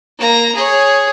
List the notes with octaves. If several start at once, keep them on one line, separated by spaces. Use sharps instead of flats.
A#3 A#5
G#4 C#5